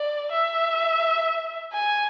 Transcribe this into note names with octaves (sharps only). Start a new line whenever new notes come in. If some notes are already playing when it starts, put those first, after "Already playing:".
Already playing: D5
E5
G#5